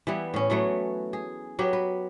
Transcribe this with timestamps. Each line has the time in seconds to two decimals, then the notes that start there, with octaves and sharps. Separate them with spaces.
0.07 E3 G3 B3 E4
0.34 A2 C#4
0.50 E3 F#3 A3 B3
1.13 G#4
1.59 F#3 B3 G4
1.73 B4